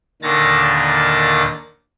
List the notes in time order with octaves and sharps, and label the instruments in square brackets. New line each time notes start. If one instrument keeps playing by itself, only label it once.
[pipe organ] D#2 A#2 D3 D#3 A6 A#6